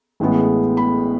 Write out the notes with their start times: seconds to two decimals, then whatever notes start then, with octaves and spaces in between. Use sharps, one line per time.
0.20 A1 A2 G#3 B3
0.77 B5